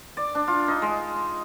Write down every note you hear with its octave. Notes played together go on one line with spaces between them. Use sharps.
D5
D4
F4
D#4
G#3